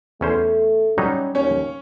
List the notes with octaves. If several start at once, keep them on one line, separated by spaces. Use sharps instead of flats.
E2 A3 C#4 C5
F#3 G3 C#4 D#4
D#2 C#4 C#5